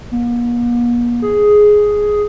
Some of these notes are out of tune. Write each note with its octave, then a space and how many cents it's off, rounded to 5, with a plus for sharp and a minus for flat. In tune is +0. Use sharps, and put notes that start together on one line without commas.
A#3 +45
G#4 +5